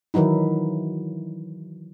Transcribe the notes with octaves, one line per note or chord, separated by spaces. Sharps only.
D#3 E3 F#3 D#4 E4